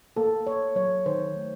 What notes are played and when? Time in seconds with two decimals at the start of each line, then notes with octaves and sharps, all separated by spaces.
0.17 A#3 A4
0.46 A#3 C#5
0.76 F#3 C#5
1.06 D#3 C5
1.36 A3